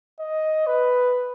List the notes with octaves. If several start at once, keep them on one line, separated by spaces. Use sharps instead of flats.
D#5
B4